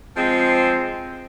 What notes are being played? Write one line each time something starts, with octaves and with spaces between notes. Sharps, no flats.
F3 G#3 C4